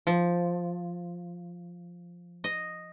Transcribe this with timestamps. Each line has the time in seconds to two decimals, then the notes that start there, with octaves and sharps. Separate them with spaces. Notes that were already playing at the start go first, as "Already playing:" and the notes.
0.07 F3
2.44 D#5